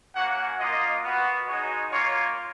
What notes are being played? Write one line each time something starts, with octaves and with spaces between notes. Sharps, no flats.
A#3 C#4 F#4 F#5
A#3 F4 D#5
B3 F#4
G#3 D#4 F#4 C#5
A#3 F4 C#5